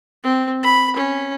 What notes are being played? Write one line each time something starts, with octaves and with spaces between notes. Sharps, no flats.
C4
B5
C#4